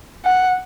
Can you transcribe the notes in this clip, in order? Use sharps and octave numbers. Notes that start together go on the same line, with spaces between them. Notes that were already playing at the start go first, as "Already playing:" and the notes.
F#5